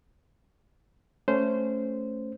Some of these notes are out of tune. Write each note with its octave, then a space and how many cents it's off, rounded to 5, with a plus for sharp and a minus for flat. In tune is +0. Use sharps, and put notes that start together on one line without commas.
A3 +0 C#4 +0 C5 -15